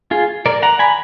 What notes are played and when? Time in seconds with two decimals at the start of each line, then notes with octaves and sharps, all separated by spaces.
0.11 F4 G#4
0.46 A#4 D5
0.62 F#5 A#5
0.79 G#5 B5